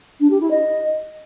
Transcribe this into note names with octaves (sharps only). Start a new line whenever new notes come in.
D4
G4
E4
D#5